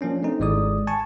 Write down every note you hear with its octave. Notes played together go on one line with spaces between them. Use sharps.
F3 A#3 C#4 D4
A3 C4 D#4
G#1 G#3 D5 D#6
G#5 A5 C#6